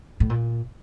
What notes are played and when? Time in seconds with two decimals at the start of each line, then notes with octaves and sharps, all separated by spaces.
0.20 A2
0.30 A#2